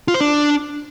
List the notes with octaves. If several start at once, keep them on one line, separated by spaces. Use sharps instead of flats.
F4
C5
D4